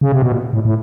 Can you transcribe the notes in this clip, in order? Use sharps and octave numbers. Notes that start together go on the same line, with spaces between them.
C#3
C3
B2
A#2
A2
A2